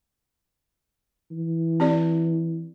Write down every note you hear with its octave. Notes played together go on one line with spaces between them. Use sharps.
E3
C4 G4 D5